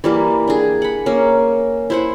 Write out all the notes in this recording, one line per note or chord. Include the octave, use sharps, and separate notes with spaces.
E3 G3 A#3
D4 G#4
F#5 B5
A#3 C#4
E4 C5 F#5